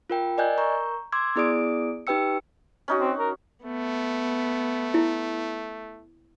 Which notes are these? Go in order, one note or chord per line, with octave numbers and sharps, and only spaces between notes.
F4 A#4 G5
A#4 D5 D#5 G#5 F#6 G6
A#4 A#5 C#6 G6
C6 D6 E6 G#6
B3 E4 G#4 D5 D#6 D7
D#4 G4 B4 G5 E6 C#7
C#4 D#4 F#4
C4
A#4
A3 B3
E4